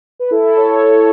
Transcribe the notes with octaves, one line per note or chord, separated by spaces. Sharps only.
B4
E4 A4
A4 C#5
A4 C#5